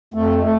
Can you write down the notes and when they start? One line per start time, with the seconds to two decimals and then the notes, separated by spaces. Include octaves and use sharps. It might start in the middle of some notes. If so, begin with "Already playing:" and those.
0.14 F2 A3
0.43 A3